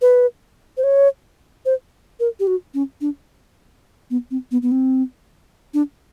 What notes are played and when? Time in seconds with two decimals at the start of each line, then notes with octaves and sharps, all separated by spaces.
0.02 B4
0.77 C5
0.83 C#5
1.66 C5
2.20 A#4
2.40 G4
2.47 F#4
2.74 C#4
3.01 D4
4.10 B3
4.31 C4
4.51 B3
4.62 B3
4.72 C4
5.74 D4